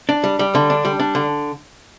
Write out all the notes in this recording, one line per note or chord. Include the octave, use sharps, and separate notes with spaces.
D4
G3
G3
D3
D4
G3
D4
D3